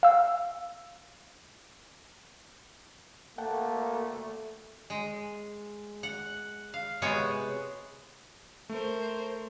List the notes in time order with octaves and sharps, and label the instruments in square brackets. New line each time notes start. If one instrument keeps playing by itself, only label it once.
[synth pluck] F5 E6
[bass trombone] A3 [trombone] A#3 [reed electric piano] F#5 G5 A5
[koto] G#3
F#5
F5
C3 G#3 B3 F#4 C#5
[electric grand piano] A3 [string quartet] A#4 C5